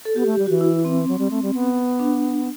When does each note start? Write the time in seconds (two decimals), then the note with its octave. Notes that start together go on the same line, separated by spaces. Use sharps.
0.05 A4
0.15 B3 G4
0.26 A3 G4
0.39 G3
0.46 E3 F#4
0.61 E4
0.85 C4
1.08 F#3
1.19 G3
1.31 A3
1.42 G3
1.54 B3
1.99 D4
2.22 D4